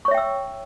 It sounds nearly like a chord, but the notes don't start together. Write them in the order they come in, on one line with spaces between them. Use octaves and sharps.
C#6 C#5 E5 G5 E6